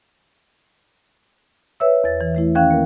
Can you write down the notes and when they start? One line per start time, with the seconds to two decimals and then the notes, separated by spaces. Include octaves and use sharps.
1.80 B4 C#5 E5 E6
2.04 E2 A6
2.21 E3
2.34 E3 A3 E4
2.55 D#3 C#4 F5 G5 F#6 G#6
2.71 A#3 A#4